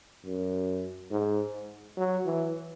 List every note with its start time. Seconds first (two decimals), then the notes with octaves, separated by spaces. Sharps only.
0.25 F#2
1.11 G#2
1.97 F#3
2.26 E3